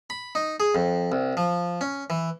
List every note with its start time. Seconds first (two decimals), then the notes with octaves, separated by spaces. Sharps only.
0.10 B5
0.35 D#4
0.60 G#4
0.75 F2
1.12 C2
1.37 F3
1.81 C#4
2.10 E3